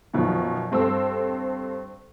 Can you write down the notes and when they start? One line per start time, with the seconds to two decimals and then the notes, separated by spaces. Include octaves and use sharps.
0.13 F#2 B2 D#3 F3
0.72 G2 C4 A4 E6